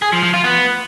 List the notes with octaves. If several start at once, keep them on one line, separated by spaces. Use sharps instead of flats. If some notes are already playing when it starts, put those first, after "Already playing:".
G#4
F3
F3
F4
B3